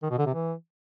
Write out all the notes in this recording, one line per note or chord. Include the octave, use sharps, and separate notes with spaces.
D#3
B2
D3
C3
E3